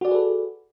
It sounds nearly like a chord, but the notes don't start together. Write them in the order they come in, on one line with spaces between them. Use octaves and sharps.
F#4 D5 G#4 B4 A4